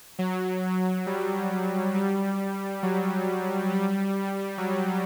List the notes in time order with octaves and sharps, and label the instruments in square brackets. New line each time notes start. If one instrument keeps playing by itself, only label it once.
[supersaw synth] F#3
G3
G3
F#3
G3
F#3